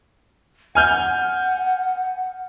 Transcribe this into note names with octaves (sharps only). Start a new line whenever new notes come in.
F#5 G#5 F6 G6